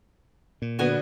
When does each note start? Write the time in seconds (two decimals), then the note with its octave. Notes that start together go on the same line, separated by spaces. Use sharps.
0.62 A#2
0.79 D3 B3 F#4 D#5 G#5